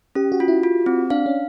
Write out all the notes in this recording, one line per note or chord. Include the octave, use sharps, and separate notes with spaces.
C#4 G4
F#4
F4
E4
F4
C4
D4 F5
C#4